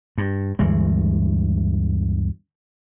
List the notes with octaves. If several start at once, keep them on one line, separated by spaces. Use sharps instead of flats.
G2
D2 G2 E3 G#3